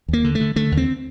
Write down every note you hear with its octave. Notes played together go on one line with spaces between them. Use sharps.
D#2 A#3
D3
A3
D3
D3 A3
D#2
C4